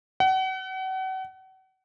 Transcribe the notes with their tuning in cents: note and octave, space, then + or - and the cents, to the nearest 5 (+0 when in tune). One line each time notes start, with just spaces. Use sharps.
F#5 +35